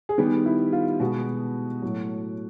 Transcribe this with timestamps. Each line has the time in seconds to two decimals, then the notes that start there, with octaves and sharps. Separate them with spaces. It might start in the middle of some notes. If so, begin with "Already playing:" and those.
0.09 G#4
0.18 D#3 G3 B3 G4
0.46 E4
0.73 F4
1.00 B2 G#3 B3 F#4
1.82 A2 F#3 A3 F#4